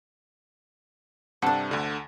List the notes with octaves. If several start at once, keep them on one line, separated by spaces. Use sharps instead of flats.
G2 C3 D4 A4 F#5
D2 D3